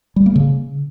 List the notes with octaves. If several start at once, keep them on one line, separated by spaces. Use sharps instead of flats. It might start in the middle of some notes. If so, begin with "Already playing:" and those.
G3
A#3
C#3